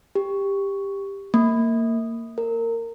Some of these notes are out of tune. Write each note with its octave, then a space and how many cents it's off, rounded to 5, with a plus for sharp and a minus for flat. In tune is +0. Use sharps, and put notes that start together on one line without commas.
G4 +15
A#3 -20
A#4 -25